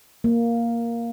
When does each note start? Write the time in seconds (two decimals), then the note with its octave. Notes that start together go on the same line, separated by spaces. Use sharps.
0.24 A#3